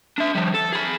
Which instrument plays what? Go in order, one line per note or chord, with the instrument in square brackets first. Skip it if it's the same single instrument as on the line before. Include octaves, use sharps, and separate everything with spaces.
[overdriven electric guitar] D4 E5
F3 G3
A4
G#4 B5